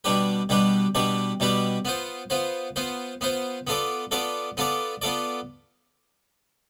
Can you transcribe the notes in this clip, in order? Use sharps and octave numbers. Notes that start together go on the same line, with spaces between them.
B2 G3 D4 G4 B4
B2 G3 D4 G4 B4
B2 G3 D4 G4 B4
B2 G3 D4 G4 B4
B3 F4 C5
B3 F4 C5
B3 F4 C5
B3 F4 C5
B3 F4 A4 D5
B3 F4 A4 D5
B3 F4 A4 D5
B3 F4 A4 D5